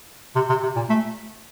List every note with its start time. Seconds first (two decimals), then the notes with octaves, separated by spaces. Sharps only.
0.36 C3
0.49 C3
0.63 C3
0.76 A#2
0.89 A3